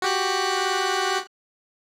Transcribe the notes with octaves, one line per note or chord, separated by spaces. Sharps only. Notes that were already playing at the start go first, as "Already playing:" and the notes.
F#4 G4 F#6